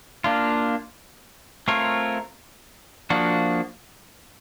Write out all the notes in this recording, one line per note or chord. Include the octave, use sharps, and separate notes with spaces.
A#3 D4 F4
A3 C4 F4 A#4 C#5
F3 A#3 D4 F#4